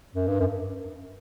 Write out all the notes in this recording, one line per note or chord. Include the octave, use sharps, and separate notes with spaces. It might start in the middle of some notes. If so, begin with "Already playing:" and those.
F#2
G2
F#2